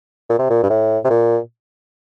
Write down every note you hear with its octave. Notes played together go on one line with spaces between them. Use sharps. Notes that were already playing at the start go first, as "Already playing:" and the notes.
A#2
C3
A#2
G2
A2
C3
A#2